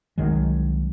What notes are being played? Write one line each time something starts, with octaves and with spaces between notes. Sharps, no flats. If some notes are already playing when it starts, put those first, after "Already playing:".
C2 D#3 F#3 G#3